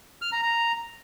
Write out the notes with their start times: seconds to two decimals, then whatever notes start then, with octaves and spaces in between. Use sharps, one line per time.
0.22 F6
0.32 A#5
0.43 A#5